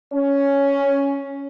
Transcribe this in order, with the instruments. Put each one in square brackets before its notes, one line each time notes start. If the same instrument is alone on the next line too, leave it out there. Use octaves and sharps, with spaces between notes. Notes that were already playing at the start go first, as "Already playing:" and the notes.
[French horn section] C#4